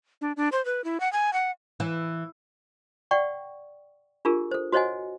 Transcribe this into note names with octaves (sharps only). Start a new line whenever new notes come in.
D4
D4
C5
B4
E4
F#5
G#5
F#5
E3
D5 F#5 G5 C#6
D4 F4 G4 G#4 A#4
A4 C5
F#4 C5 C#5 D#5 F#5 G#5